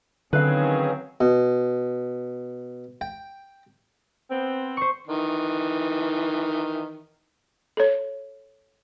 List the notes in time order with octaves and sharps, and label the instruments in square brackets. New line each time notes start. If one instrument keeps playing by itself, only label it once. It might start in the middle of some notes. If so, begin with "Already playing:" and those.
[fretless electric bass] D3 [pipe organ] D#3 C#4 G#4 [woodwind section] F#3 C4 [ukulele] B4 F5
[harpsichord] B2
G5
[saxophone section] B3 C4
[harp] C5 C#6
[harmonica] D#3 E3
[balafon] A4 C#5